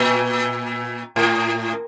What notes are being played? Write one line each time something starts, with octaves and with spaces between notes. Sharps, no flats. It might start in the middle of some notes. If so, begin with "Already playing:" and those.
Already playing: A#2
A2